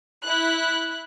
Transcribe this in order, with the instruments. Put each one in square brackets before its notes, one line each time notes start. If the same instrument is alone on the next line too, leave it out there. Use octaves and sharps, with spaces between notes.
[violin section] E4 F#6